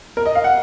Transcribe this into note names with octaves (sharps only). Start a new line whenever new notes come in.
A#4
D#5
F5
F#5